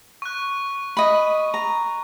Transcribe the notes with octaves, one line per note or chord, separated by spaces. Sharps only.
C#6 F#6
D#5 B5
A#5